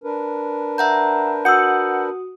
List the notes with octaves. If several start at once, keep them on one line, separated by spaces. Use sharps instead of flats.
D4 A#4 B4
E5 F#5 A#5 G6
F#4 F#5 D#6 E6 G6